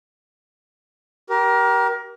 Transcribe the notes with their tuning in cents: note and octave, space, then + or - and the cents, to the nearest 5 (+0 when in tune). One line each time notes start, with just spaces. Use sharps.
G4 -25 A#4 +25